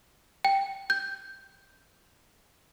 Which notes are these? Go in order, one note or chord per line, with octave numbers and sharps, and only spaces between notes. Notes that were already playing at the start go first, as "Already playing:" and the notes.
G5
G6